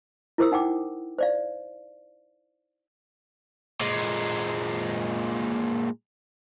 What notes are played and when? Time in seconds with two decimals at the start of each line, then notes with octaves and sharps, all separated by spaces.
0.38 E4 A#4 C5 D#6 E6
0.52 D#4 F#5 G5 D6
1.18 C5 D5 F5
3.81 A#2 G#3